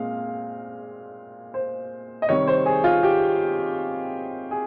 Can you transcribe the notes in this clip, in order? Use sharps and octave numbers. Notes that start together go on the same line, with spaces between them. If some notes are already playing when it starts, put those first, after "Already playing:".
Already playing: A#2 G#3 C4 F5
C5
D#5
C3 D#3 G3 C#5
C5
G#4
F4
G4
G#4